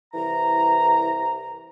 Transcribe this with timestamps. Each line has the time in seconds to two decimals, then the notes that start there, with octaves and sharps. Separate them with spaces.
0.14 C2 E3 A#5